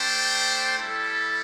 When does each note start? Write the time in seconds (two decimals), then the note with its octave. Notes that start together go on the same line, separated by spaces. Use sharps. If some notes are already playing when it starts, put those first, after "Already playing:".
Already playing: A3 D4 C5 G5
0.77 G3 E4 A4